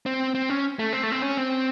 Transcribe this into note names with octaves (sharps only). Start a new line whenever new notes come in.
C4
C4
C#4
A3
C4
A3
C4
C#4
C4